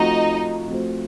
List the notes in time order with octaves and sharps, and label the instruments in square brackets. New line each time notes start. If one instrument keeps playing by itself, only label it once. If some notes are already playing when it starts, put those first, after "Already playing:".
Already playing: [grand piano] F3 A3 C4 F#4 C5 [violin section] D#4 D#5
[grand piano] F3 A3 C4 F#4 C5